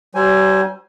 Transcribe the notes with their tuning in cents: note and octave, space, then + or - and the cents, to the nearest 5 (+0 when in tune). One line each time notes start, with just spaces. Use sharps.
G3 -40 C5 +0 G#5 +0